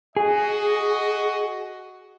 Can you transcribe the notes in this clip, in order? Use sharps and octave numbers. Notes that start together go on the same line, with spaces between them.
F#4 G#4 D#5